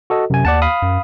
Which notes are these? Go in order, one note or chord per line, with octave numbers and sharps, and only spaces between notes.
F#4 A4 D#5
F#2 C3 G#5
D#2 D5 F#5 A5
F5 B5 D#6
F#2